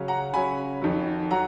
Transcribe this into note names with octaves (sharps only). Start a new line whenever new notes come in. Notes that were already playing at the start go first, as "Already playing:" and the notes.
Already playing: C#3 F#3 C#4
F#5 A#5
C#3 F#3 C#4 G#5 B5
F2 D#3 F#3
F#3 F#5 A#5